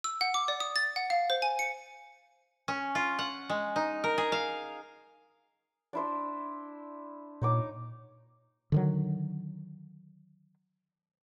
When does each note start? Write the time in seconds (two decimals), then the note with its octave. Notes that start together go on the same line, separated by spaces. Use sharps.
0.04 E6
0.21 F#5
0.34 D6
0.48 D5
0.60 D#6
0.76 A6
0.96 F#5
1.10 F5
1.30 C5
1.42 G#5
1.59 C#7
2.68 C#4
2.95 F4
3.19 F#5
3.50 G#3
3.76 D#4
4.04 A#4
4.18 G#4
4.32 F5
5.93 D4 E4 C5
7.42 A#2 D#4 C#5 D6
8.72 D3 D#3 F#3